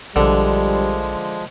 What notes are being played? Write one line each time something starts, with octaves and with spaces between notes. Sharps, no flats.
A#1 D3 F3 G3 G#3